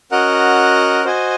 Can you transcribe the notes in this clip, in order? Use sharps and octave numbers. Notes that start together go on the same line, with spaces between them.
C#4 F#4 A#4 D#5 F#5
F#4 C5 D#5 G#5